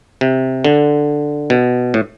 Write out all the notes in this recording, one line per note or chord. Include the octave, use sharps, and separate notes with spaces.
C3
D3
B2
A2